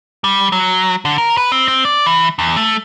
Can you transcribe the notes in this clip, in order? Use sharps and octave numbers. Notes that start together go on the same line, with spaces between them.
G3
F#3
D3
A#4
B4
C4
C4
D5
E3
E2
A3